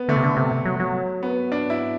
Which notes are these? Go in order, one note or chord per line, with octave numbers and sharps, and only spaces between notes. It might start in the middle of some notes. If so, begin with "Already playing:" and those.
Already playing: B3
D3 A3
C3
D3
C3
F#3
F#3
B3
D4
E4